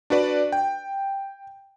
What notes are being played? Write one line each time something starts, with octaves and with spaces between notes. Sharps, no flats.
D4 F#4 B4 D5
G5